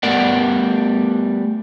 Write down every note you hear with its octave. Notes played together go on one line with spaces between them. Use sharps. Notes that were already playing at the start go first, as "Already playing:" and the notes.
G3 A3 B3 A#4 D5 F#5